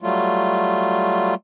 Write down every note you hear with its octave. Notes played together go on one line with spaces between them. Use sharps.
F#3 G3 A3 F4